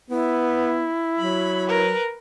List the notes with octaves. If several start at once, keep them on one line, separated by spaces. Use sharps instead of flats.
B3 E4
F#3 B5
A#4 B4